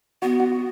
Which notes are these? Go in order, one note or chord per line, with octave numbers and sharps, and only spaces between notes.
B3 F#4
F#4